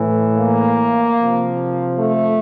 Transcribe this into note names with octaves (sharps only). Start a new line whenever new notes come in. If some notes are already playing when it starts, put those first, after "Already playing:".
Already playing: A2 E3
A#3
C3 F3
A3